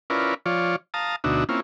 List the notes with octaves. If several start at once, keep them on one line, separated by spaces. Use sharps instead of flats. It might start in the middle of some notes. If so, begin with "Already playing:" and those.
C#4 E4 F4 A#4 B4 D5
F3 F4 C#5 D5
F5 A5 A#5 D#6
D2 B2 D4 D#4 F#4 E5
A#3 C4 C#4 E4 F4